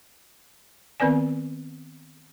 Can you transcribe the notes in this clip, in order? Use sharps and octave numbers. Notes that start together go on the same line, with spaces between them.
D#3 B3 C4 B4 D5 G#5